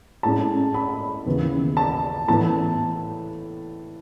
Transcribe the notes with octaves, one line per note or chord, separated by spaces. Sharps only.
A2 G#3 C#4 A5
B5
D#2 C#3 E3 B3
A5
A2 E3 B3 A5